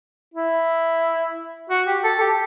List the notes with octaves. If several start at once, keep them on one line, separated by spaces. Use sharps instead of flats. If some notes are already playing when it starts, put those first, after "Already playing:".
E4
F#4
G4
A4
G4